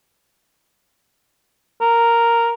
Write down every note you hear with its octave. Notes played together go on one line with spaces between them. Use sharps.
A#4